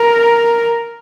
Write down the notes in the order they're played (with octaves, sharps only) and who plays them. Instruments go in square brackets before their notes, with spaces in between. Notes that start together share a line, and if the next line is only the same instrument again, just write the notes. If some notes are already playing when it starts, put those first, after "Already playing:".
Already playing: [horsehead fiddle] A#4